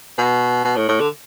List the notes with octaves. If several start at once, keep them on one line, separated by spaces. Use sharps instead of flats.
B2
B2
A2
A2
D3